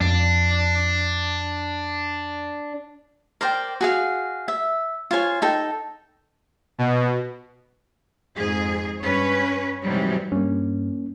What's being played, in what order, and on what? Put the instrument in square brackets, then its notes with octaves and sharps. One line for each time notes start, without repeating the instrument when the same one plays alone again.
[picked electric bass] F2 [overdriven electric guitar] D4
[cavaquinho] A#4 C5 D5 G5
F#4 G#4 F5
E5
F4 C5 C#5 G#5
D#4 A4 G5
[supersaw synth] B2
[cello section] F2 G#2 G#4
G2 C#4 B4 C#5
G#2 C3 E3 F#3 G3
[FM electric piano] G2 [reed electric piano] A#3 C#4